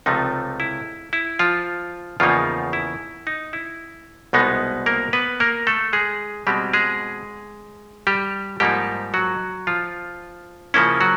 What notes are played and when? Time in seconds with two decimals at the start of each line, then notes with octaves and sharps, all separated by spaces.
0.06 C#2 C3 F3 A3 D#4
0.60 E4
1.13 E4
1.39 F3 F4
2.20 E2 C#3 F3 A#3 D#4 F4
2.73 E4
3.27 D#4
3.53 E4
4.33 C2 B2 G#3 B3 D#4
4.86 A#3 A#4
5.13 B3 B4
5.40 A#3 A#4
5.67 A3 A4
5.93 G#3 G#4
6.47 B2 G3 G#3 C4 G4
6.73 G#3 G#4
8.07 G3 G4
8.60 G#2 F3 G3 A#3 D#4 G4
9.14 F#3 F#4
9.67 F3 F4
10.74 C#3 F3 A#3 C#4 E4
11.00 F#3 F#4